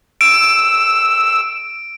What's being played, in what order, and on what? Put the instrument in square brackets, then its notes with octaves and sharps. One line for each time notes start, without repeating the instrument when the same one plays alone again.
[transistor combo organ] E6 [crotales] D7